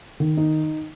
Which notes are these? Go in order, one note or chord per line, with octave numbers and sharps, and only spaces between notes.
D#3
D#4